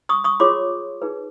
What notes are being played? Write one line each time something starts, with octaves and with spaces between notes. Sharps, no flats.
C#6 D#6
C#6 D#6
F4 G#4 C#5 C6 D6
D#4 G#4 B4